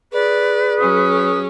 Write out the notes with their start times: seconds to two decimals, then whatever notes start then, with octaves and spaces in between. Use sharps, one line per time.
0.12 G#4 B4 D5
0.78 F#3 C#4 D#6